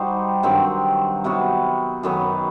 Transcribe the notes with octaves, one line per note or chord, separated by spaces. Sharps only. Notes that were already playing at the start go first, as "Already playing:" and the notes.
Already playing: G3 D#4 F#4 C5
G2 D#3 F#3 C4
C3 F#3 B3 F#4
F#2 D#3 F#3 B3